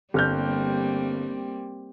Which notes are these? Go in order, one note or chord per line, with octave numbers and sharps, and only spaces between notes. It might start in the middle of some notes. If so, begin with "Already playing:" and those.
G1 G3 A#3 C4 F6 G6